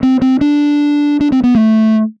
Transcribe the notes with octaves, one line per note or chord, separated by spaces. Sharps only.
C4
C4
D4
D4
C4
B3
A3